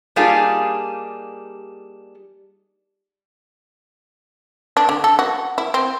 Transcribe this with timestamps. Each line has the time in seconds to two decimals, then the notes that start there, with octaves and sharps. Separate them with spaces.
0.16 G3 A#3 D4 D#4 F4 G#4
4.77 D4
4.89 D3
5.04 A4
5.19 F#4
5.58 E4
5.74 C4